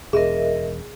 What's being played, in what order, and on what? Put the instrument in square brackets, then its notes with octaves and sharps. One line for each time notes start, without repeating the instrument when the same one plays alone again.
[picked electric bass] E1 [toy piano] G#4 [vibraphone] A#4 D#5 E5